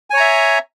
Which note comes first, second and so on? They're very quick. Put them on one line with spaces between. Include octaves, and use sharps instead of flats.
G#5 C#5 A#5 E5